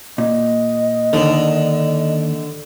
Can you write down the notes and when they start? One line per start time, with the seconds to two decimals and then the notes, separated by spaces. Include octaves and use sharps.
0.18 A#2 D#5
1.13 D#2 D3 D#3